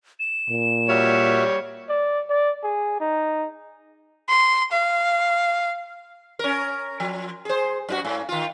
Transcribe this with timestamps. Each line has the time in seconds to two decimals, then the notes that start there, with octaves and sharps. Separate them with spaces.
0.20 E7
0.50 A#2
0.89 G3 F#4 C#5 E5 F6
1.89 D5
2.30 D5
2.63 G#4
3.00 D#4
4.29 C6
4.72 F5
6.39 C#4 A#4
7.00 F3
7.45 G#4 C5
7.89 F#2 D#4 F#4
8.05 G#2
8.29 D#3 F4